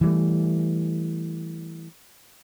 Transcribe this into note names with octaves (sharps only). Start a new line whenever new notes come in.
E3 G3 A3